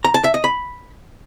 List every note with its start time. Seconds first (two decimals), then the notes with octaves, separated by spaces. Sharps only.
0.05 A#5
0.14 A5
0.24 E5
0.34 D#5
0.44 B5